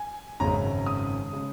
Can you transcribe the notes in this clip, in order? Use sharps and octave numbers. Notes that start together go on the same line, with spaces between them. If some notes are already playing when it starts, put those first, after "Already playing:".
Already playing: G#5
G#1 F#2 C#3 G#3 A#5
D#6
C#3 G#3